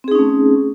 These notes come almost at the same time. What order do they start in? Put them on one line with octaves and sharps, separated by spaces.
C4 G#4 D#4 C#4 A3